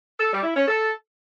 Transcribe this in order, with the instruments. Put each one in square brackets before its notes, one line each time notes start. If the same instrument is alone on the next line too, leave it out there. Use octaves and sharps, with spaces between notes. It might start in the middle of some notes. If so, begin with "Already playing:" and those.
[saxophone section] A4
G3
E4
C#4
A4